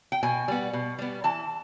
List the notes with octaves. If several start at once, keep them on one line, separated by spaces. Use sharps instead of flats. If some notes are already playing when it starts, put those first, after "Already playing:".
G5
B2 G#5
G3 B3
B2
G3 B3
E3 A5